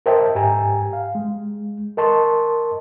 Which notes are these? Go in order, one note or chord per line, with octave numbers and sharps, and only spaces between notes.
A#4 C5 D#5 E5 G5 A5
G#2 G4 G5 G#5 A#5
F5
G#3
A#4 D#5 A5 C6 C#6